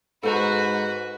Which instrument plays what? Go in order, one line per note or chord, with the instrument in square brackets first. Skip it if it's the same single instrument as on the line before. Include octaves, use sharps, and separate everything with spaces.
[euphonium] G#2 [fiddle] F#4 B4 [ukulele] A4 C5 A#5